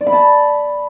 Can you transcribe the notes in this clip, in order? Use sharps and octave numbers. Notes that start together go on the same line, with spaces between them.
D5
B5
A5